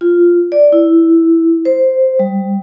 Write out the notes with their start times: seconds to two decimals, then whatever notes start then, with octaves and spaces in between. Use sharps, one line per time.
0.01 F4
0.52 D5
0.72 E4
1.65 C5
2.19 G3